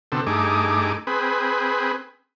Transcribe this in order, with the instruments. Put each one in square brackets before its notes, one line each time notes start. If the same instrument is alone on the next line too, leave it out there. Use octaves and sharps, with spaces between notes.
[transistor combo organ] B2 D3 C4 A4
G2 A3 D#4 G#4 D6
C4 G#4 B4